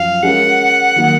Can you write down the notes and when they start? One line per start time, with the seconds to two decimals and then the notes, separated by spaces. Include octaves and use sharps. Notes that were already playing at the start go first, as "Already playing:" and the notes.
Already playing: F#2 F3 F5
0.23 G#3 C#4 F#4 A#4 F#5
0.96 D#3 F#3 A#3